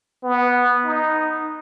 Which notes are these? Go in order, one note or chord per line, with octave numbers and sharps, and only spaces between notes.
B3
D#4